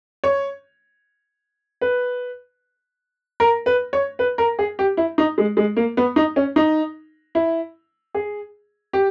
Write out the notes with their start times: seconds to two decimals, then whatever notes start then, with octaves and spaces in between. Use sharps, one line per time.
0.24 C#5
1.81 B4
3.40 A#4
3.66 B4
3.93 C#5
4.19 B4
4.38 A#4
4.59 G#4
4.79 G4
4.97 E4
5.18 D#4
5.38 G#3
5.57 G#3
5.77 A#3
5.97 B3
6.16 D#4
6.36 C#4
6.56 D#4
7.35 E4
8.15 G#4
8.93 G4